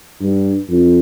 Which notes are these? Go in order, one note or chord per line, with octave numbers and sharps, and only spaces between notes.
G2
F2